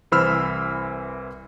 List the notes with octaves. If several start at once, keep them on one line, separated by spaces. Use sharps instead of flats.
C2 E3 C5 B5 E6 F6